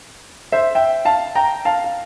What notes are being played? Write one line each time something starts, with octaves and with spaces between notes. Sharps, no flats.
C5 E5
E5 G5
F5 A5
G5 A#5
F5 A5
F5